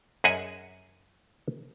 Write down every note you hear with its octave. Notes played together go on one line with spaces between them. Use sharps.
F#2 G#4 D#5 E5 F#5 G#5